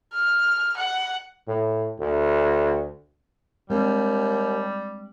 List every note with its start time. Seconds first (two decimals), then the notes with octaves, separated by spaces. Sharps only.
0.13 F6
0.77 F#5
1.47 A2
1.99 D2
3.70 D#2 G3 G#3 C4 D4